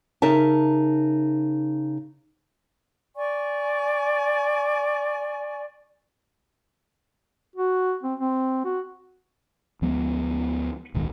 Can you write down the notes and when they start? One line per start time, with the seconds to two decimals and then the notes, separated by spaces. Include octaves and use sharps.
0.22 C#3 D#4 A#4 E5 A5
3.17 D5 G#5 C#6
7.56 F#4
8.03 C4
8.20 C4
8.65 F#4
9.82 D2 F3 G#3 B3
10.94 D1 B1 D#3 G#3